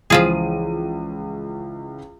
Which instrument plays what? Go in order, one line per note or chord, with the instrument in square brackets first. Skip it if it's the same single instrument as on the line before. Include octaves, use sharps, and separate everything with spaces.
[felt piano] C#2 E3 D#7 [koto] F3 F4 G#4